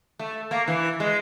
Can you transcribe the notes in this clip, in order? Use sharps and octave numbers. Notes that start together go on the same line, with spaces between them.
A3
A#3
E3
G#3